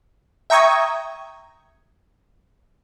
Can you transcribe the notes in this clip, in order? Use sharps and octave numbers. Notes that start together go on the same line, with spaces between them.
E5 G5 A#5 C#6 D#6 G#6